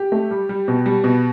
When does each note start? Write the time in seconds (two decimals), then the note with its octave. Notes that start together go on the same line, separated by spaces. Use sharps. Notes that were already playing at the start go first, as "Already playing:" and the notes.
Already playing: G4
0.12 A3
0.31 G3
0.49 G3
0.68 B2
0.86 G3
1.04 B2